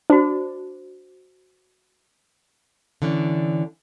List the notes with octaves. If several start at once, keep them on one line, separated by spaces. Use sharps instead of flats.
D4 F#4 C5
D3 E3 C#4 D4